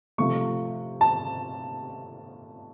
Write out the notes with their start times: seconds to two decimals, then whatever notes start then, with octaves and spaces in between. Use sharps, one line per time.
0.18 C3 F3 A3 C#6
1.01 A5